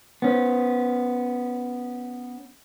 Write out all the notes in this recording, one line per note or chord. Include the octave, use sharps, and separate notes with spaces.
B3 C#4